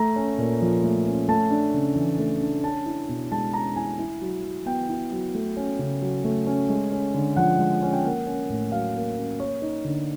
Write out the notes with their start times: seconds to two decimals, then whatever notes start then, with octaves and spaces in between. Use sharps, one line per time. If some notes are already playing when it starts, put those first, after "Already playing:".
Already playing: A3 A#5
0.16 C#4
0.38 A#2
0.61 F3
0.84 A3
1.06 C#4
1.28 A3 A5
1.51 D4
1.74 C#3
1.96 E3
2.19 A3
2.41 D4
2.63 C#4 A5
2.86 E4
3.09 B2
3.32 G#3 A5
3.54 C#4 A#5
3.76 E4 G#5
3.99 E4
4.22 F#3
4.44 F#3
4.66 B3 G5
4.89 E4
5.12 F#3
5.35 A3
5.57 C#4
5.79 C#3
6.02 F#3
6.24 A3
6.47 C#4
6.69 G#3
6.92 C#4
7.14 D3
7.36 F3 F#5
7.59 G#3
7.82 C#4
7.93 G5
8.04 A#3 F#5
8.27 C#4
8.50 A2
8.72 F#3 F5
8.94 A#3
9.17 C#4
9.39 A#3 C#5
9.62 D#4
9.85 D3